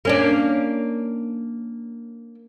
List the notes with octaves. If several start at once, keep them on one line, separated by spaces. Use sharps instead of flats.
A#3 C#4 D4